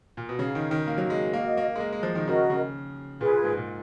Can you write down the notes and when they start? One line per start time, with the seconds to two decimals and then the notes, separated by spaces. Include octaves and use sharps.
0.17 A#2
0.29 B2
0.39 C#3 D#4 G#4 C#5 F5
0.55 D#3
0.71 D#3
0.87 A#3
0.98 F#3
1.10 G#3
1.33 A#3 F#4 A#4 D#5
1.57 A#3
1.76 G#3
1.80 A#3
1.92 G#3
2.03 F3
2.15 D#3
2.27 C#3 F#4 A#4 D#5
2.50 C#3
3.20 A#2 F4 G#4 B4
3.44 G#2
3.57 A#2